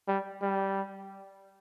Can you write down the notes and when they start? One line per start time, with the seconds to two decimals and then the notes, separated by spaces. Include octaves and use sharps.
0.08 G3
0.42 G3